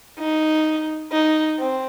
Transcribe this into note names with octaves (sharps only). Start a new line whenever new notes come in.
D#4
D#4
C4